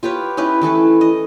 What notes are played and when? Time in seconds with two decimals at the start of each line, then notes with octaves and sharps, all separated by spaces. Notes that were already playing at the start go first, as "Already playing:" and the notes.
0.03 F4 G4 B4 C#5
0.37 C#4 D#4 E4 B4
0.62 E3 A3 A4 B4
1.01 D#5